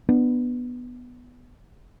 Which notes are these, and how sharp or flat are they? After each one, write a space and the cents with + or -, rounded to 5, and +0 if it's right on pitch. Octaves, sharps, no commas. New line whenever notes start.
B3 +0 D4 +25